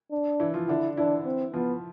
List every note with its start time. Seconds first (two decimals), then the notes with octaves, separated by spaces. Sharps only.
0.12 D4
0.40 E3 E4
0.54 F3 F4
0.68 D3 D4 E4
0.97 E3 D4 E4
1.25 C4
1.53 F3 B3 F4